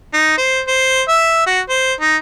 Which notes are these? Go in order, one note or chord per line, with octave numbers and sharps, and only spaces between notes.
D#4
C5
C5
E5
F#4
C5
D#4